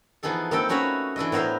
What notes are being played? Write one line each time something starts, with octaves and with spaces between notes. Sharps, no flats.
E3 F3 B3 D#4 G#4 A4
A#3 C4 D#4 A4 G5
A3 C#4 F#4 B4 C#5 D#5
E3 D4 E4 D#5
A2 B3 A#4 C5 E5 F5